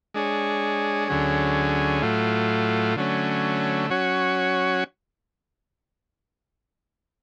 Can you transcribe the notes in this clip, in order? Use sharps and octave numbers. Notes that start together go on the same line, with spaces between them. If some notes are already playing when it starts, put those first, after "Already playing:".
G#3 D4 G#4 C#5
D2 D3 F#3 C#4 G#4
A2 F#3 A3 F4
D3 F#3 A3 C#4
F#3 C#4 F#4 C#5